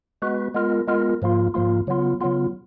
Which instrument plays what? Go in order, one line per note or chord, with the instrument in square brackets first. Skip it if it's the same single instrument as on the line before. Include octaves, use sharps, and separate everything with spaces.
[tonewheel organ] G#3 B3 F#4 B4
G#3 B3 F4 A#4
G#3 B3 F4 A#4
G#2 F3 A#3 F4
G#2 F3 A#3 F4
C#3 F#3 B3 F4
C#3 F#3 B3 F4